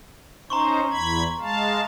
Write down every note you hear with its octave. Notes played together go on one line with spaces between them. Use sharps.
C#4 D#4 C5 A#5 C6 C#6
E2 B5 G#6
G#3 F5 A5